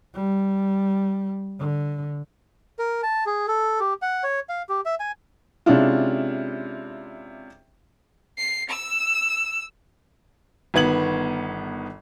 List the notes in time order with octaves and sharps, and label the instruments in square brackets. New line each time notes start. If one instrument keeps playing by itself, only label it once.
[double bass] G3
D3
[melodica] A#4
A5
G#4
A4
G4
F#5
C#5
F5
G4
E5
G#5
[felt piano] C3 G#3 C#4 D4 E4 F4
[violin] C7
E6
[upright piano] G1 D#3 B3 G#6 F#7